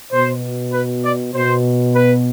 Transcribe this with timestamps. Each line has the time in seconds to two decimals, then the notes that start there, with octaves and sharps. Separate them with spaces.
0.12 B2 C5
0.73 B4
1.04 D5
1.34 B2 C5
1.95 B4